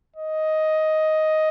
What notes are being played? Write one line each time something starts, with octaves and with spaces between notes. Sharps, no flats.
D#5